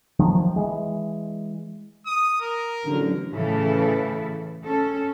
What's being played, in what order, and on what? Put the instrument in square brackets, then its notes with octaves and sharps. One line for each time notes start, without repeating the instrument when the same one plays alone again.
[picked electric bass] D#3 F3 F#3
E3 G#3
[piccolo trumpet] D#6
A#4
[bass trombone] A1 [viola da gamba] D3 F#3
[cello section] A2 C#3 E3 E4 A4 B4
C#4 A4